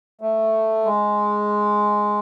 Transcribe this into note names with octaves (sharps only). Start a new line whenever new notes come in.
A3
G#3